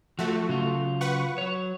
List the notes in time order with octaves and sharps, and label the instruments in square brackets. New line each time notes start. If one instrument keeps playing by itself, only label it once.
[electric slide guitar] F3 [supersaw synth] A3 F#4
[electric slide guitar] C#3 F#3 F4
[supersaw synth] B4 F#5 C#6
[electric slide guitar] F#3 C#5